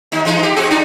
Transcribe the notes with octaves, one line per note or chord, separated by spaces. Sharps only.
D#2 D#4
E3 G#3 D#4
G4
C4 F#4 G#4
D4 D#4